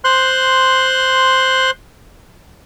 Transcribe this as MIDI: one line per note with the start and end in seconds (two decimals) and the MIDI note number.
0.04 1.71 72
0.04 1.71 84
0.04 1.71 90